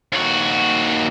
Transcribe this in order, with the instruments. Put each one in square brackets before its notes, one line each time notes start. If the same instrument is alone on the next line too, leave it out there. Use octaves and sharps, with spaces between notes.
[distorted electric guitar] D#2 F#4